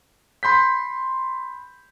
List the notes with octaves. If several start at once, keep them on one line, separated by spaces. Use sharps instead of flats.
B5 C6 G6 B6